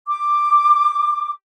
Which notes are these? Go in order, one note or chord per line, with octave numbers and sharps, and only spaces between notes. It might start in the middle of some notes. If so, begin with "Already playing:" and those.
D6